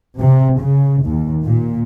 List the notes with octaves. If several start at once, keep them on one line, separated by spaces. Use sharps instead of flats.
C3
C#3
D#2
A#2